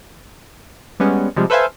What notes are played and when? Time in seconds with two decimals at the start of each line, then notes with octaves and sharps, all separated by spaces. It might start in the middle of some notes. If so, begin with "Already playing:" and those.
1.00 G3 G#3 B3 C#4
1.36 C3 F3 G3 G#3
1.50 A4 B4 C5 E5 F5 G#5